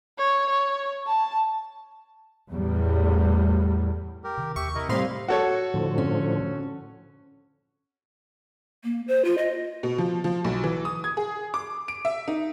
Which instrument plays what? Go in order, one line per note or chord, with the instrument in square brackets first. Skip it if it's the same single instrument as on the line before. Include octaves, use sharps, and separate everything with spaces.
[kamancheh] C#5
C#5
A5
[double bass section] E2 A2 G3
[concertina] G4 A#4
[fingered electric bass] C3 D#3
[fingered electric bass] D#2 [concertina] G4 E5 [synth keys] C#6
[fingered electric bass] C3 [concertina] E4 A#4 D#5
[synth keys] A2 F5 C6 [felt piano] G3 C4 [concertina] D#4 D#5 B5
[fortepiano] F#4 A4 C#5
[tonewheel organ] A2 D3 F3
[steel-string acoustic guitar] C#4
[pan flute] A#3
C5
F4
D#5
[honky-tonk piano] B2
F3
F3
B1
E3
D#6
G#6
G#4
D6
D7
E5
D#4